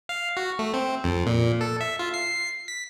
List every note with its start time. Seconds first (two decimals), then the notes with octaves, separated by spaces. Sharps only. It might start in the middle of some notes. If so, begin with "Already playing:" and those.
0.09 F5
0.37 F#4
0.59 A3
0.74 C4
1.04 F2
1.26 A#2
1.61 A4
1.81 E5
1.99 F4
2.14 C7
2.68 B6